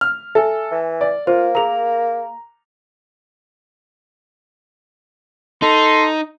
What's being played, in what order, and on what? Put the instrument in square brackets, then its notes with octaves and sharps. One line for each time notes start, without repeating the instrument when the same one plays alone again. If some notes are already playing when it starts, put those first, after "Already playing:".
[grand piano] F6
[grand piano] A4 [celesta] E5 G#5
[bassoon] E3
[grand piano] D5
[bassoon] A#3 [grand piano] F4 [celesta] C5
[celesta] G#4 A#4 [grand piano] A#5 F7
[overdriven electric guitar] D#4 [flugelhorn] A4 [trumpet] C6